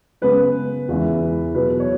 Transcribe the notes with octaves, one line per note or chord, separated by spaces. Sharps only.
F#2 C#3 G#3 B3 B4
E2 E3 G#3
E2 B2 F#3 B3 B4
C#5